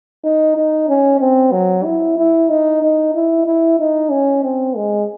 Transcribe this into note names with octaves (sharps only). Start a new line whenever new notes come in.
D#4
D#4
C#4
C4
F#3
E4
E4
D#4
D#4
E4
E4
D#4
C#4
C4
G#3